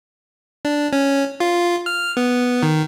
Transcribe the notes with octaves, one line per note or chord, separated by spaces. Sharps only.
D4
C#4
F4
F6
B3
D#3